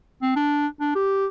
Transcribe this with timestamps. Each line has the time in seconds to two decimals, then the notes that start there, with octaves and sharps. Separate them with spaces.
0.22 C4
0.36 D4
0.81 D4
0.95 G4